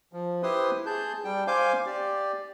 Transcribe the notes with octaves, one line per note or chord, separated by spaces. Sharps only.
F3
E4 G4 B4 C5 C6 D#6
G#4 A5 G6
G3 G5
C5 F5 G#5 D6 G6
G4 D5